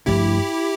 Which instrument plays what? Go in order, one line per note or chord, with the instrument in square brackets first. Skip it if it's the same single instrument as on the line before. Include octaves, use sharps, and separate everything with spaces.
[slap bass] G2 F3 A3 D4 [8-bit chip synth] E4 G4